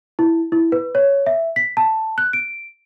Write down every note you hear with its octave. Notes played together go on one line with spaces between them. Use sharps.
E4
E4
B4
C#5
E5
B6
A5
F#6
D7